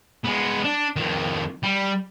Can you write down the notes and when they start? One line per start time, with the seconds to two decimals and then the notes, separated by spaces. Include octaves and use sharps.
0.25 G#3 B3
0.65 D4
0.96 F2 D#3
1.63 G3